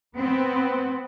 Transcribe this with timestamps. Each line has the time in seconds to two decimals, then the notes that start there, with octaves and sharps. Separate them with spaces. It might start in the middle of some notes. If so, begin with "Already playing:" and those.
0.16 B3 C4